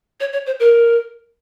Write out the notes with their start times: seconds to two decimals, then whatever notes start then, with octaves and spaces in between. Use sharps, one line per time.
0.20 C#5
0.33 C#5
0.46 C5
0.60 A#4